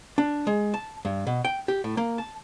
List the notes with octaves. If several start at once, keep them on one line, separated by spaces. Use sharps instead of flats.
D4
G#3
A5
G2
B2
G5
G4
A2
A#3
A5